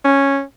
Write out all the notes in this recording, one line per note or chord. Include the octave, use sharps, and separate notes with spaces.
C#4